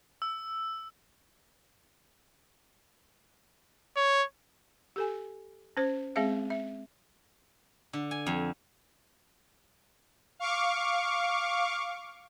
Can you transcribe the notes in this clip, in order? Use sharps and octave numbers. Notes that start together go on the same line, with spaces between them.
E6
C#5
G4 A4 G#5
C#4 C5
G#3 C4 G#4 E5 F5
E5
D3
G#5
F2
F5 C#6 D6